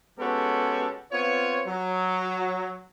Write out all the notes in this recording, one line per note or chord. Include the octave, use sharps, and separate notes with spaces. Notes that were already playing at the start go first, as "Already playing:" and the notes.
G#3 B3 C#4 F#4 G4 A4
B3 C4 F4 C#5
F#3